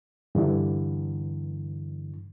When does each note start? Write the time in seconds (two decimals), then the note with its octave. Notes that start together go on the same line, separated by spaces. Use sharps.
0.35 G2 D3 E3